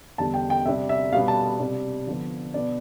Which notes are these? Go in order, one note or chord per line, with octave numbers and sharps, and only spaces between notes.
E2 D3 G3 D4 A5
G5
G5
C3 G3 D4 E5
E5
B2 G3 B3 D4 F5
A5
C3 G3 D4
D3 F3 B3 D4
B2 B3 D4 D5